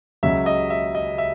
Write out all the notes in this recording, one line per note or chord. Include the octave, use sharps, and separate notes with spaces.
C#2 C#3 F#3 E5
D#5
E5
D#5
E5